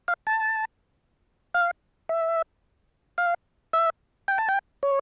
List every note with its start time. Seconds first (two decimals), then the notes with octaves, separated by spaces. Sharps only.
0.08 F5
0.27 A5
1.54 F5
2.09 E5
3.18 F5
3.73 E5
4.28 G5
4.38 A5
4.49 G5
4.83 C#5